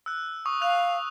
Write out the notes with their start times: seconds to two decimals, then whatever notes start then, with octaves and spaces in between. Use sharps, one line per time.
0.06 E6 F#6
0.46 C#6 D#6
0.62 F5 F#6 F7